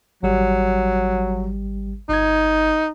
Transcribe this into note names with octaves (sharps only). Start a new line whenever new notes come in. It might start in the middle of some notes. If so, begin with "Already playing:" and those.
G#1 F#3 G3 G4
G1 D#4 G#6